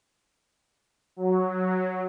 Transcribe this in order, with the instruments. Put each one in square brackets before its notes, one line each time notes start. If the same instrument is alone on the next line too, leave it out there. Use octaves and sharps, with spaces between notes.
[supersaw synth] F#3